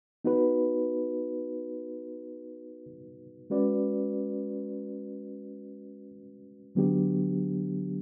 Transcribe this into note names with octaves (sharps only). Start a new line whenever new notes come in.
B3 D#4 F#4 B4
G#3 C#4 F#4 B4 D5
D3 F#3 B3 D4 G4